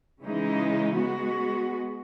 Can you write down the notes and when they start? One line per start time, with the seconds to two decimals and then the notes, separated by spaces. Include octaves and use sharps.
0.21 C#3 E3 G#3 D#4
0.98 G#3 B3 F#4